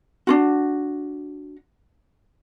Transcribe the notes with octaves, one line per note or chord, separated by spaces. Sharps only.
D4 F4 F#4